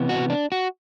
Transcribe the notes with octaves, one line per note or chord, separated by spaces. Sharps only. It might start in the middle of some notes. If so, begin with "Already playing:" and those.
Already playing: C3 E3 B3
F#4
D4
F#4